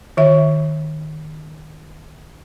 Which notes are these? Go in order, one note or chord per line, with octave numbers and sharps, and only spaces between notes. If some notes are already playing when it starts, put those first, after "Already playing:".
D#3 E5